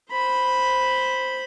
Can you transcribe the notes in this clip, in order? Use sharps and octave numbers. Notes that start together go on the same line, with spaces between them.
C5 B5